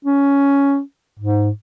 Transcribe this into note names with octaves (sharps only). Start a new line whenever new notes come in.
C#4
G#2